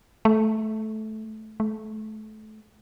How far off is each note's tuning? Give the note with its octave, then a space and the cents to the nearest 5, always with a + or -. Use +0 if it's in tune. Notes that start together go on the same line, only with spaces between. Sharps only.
A3 -15
A3 -30